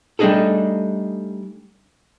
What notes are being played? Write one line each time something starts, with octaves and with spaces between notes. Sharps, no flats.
G3 A3 D4 D#4 G#4 A4